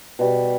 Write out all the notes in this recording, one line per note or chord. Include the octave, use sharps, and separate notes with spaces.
B2 G3